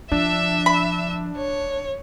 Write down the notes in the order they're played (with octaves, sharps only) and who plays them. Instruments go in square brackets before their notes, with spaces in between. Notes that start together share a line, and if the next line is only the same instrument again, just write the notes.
[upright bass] F3 [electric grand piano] D4 [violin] E5 E6
[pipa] B5
[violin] C#5